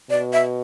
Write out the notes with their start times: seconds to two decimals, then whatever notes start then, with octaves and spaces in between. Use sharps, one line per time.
0.10 B2 D5
0.33 E5